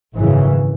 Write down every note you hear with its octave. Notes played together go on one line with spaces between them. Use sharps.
G#1 F#2 C#3 E3